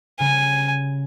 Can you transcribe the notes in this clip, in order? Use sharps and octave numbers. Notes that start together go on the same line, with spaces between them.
C#3 G3 G#5